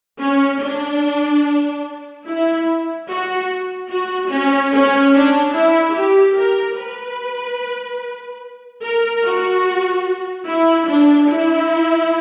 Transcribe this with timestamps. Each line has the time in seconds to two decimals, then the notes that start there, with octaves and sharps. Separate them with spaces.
0.21 C#4
0.61 D4
2.26 E4
3.08 F#4
3.91 F#4
4.30 C#4
4.73 C#4
5.14 D4
5.54 E4
5.95 G4
6.37 A#4
6.77 B4
8.82 A#4
9.24 F#4
10.47 E4
10.88 D4
11.29 E4